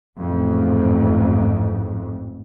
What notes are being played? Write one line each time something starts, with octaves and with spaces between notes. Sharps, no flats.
A1 F2 G#2